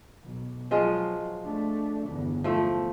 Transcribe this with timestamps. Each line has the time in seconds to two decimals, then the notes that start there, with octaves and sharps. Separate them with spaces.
0.23 B1
0.71 F3 F#3 G#3 F4
1.44 A3 D4
2.08 G1 E2
2.44 E2 F3 A3